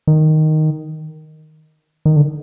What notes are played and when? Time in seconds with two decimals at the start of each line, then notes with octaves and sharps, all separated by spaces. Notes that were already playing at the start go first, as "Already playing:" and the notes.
0.07 D#3
2.05 D#3
2.16 D3